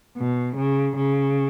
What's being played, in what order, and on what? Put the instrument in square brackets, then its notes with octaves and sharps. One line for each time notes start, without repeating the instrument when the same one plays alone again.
[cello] B2
C#3
C#3